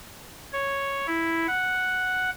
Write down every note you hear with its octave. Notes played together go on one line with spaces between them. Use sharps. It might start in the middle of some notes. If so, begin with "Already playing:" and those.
C#5
E4
F#5